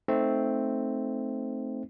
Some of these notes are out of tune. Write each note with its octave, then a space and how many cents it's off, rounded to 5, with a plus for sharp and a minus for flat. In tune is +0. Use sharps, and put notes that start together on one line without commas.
A3 +0 C4 +0 D#4 +0